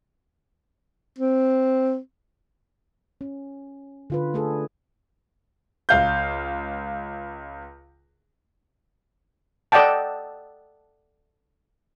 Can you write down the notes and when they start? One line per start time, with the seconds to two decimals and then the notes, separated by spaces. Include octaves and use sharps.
1.19 C4
3.21 C#4
4.10 D3 F4 B4
4.34 A3 D4 G#4 A4
5.89 C#2 F5 G6
9.72 A4 D5 D#5 F#5 G5 A5